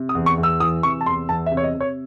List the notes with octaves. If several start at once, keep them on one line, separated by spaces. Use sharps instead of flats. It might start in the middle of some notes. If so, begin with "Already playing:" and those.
Already playing: C3
D#6
E2
C#6
E2
E6
E3 D#6
C3 C#6
A5
E2 C6
E2 A5
E5
C3
C#5
D#5
C3
C#5